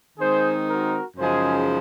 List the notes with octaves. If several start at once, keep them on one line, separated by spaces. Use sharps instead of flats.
D#3 G#3 C4 D#4 G#4 C5
F#4 A#4
F#2 C#3 F3 G#3 D#4 G#4 C5